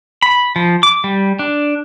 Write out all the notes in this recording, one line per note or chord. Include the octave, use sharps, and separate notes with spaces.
B5
F3
D6
G3
D4